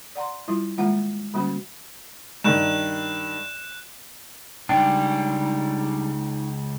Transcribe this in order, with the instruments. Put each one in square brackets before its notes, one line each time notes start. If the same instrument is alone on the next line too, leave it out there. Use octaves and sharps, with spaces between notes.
[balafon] D5 F#5 A#5 C6
F#3 G3 E4 F4
D#3 G#3 A#3 F4 F#5 A#5
D3 G3 A#3 C#4 F#4 B5
[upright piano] G2 D#3 [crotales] F#6 E7
[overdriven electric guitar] C#2 [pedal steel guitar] G3 D4 [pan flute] D#4 [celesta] G5